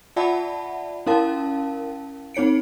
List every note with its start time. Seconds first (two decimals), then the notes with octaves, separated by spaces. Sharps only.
0.16 F4 D5 E5 F#5 A5 B5
1.07 C#4 E4 A#4 F5 A5
2.34 C4 D#4 C#5 C#7 D7